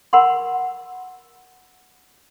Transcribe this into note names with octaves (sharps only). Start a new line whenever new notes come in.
A#4 F#5 B5 C6